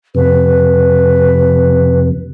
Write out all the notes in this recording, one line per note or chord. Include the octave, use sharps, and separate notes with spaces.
F2 C3 B4